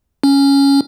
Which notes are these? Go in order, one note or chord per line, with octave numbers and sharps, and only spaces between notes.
C#4